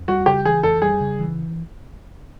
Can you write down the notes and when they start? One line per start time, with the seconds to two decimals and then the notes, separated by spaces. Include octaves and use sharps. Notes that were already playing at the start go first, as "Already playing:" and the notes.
Already playing: F2
0.08 G3 F#4
0.26 C#3 G4
0.45 E3 G#4
0.63 F2 A4
0.82 G3 G#4
1.00 C#3
1.19 E3